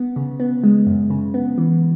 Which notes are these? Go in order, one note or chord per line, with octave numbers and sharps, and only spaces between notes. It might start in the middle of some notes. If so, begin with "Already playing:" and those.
Already playing: B3
C#3
B3
G#3
F#2
C#3
B3
E3